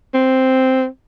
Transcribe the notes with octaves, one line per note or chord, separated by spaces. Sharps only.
C4